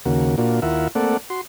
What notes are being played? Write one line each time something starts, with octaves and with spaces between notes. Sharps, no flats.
D#2 C#3 A#3 F#4
A#2 A#3 D4 F4 F#4
D#2 E4 F4 A#4 E5 F#5
A3 A#3 C4 A4 D5 F#5
F#4 C6